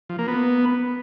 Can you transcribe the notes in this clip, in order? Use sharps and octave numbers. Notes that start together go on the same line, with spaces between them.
F3
A#3
B3